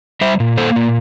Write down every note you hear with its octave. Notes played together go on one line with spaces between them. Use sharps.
G3 C5 E5
A#2
A#3 A4 C5
A#2